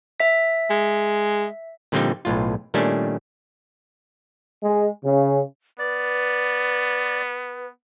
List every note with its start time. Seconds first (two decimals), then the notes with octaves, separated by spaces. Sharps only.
0.20 E5 B6
0.70 G#3
1.92 A#2 D3 F3 G3 C4 D#4
2.25 B1 A2 F4
2.74 A#2 D#3 G3 A3 C#4 D4
4.63 G#3
5.04 C#3
5.79 B3 B4 D5